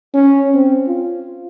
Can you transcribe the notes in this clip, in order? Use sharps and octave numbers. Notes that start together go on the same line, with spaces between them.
C#4
C4
F4